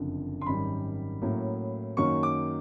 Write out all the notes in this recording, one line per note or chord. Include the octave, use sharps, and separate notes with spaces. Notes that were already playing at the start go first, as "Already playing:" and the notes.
Already playing: F#1 F2 D3
C6
G#1 F#2 D#3 G3 B5
A2 F#3 A#3 C#4 E4
F#2 D#3 F#3 A#3 C#6
D6